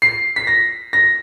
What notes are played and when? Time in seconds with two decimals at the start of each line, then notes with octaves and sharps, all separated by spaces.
0.02 C7
0.36 B6
0.47 A#6
0.93 A#6